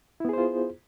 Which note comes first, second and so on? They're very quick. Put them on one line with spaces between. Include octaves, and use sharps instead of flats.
E4 B3 G#4 C5 F4